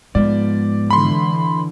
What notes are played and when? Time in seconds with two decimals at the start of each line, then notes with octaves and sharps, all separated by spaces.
0.15 G#2 F3 G#3 B3 D5
0.91 D3 E3 B5 C6